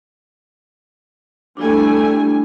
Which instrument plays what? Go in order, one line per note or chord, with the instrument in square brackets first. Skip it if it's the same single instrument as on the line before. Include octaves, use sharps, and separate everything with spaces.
[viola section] G3 A3 G#5 [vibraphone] D4 E4